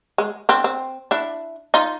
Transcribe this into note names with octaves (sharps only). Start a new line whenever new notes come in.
G#3
C4 D4
C4
D4 E4
D#4 F4